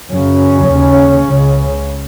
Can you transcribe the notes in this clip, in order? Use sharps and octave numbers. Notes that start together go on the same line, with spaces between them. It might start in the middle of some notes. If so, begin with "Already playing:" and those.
F#2 C#3 C#4
D#2 C#3
C#2 C#3